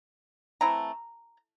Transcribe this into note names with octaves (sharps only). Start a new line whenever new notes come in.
E3 A3 C4 E4 A#5